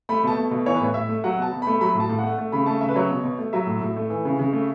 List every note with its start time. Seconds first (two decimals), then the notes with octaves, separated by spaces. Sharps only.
0.09 A3 B5
0.23 B2 A5
0.37 A3
0.51 B2
0.66 E3 C#5
0.74 B4
0.81 A2 C#5
0.94 A2 E5
1.09 A3
1.24 F#3 F#5
1.38 B2 A5
1.52 B2
1.62 A3 B5
1.81 F#3 B5
1.95 A2
2.00 A5
2.09 A2
2.19 A3 F#5
2.38 A3
2.52 C#3 B5
2.66 A3 A5
2.81 C#3 E5
2.89 B4
2.95 F#3 C#5
3.10 B2
3.24 B2
3.39 A3
3.53 F#3 E5
3.67 A2
3.81 A2
3.96 A3
4.10 E3
4.25 C#3
4.39 C#3
4.53 A3